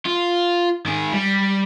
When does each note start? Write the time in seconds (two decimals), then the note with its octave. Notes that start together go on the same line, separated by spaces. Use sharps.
0.05 F4
0.86 D#3 G#4
1.13 G3